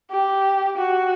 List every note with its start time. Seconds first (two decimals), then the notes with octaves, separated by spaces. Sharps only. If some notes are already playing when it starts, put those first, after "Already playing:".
0.11 G4
0.77 F#4